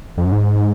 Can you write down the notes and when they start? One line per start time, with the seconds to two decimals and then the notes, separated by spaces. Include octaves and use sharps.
0.18 F2
0.25 F#2
0.32 G#2